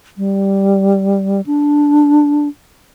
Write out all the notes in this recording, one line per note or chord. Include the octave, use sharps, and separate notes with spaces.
G3
D4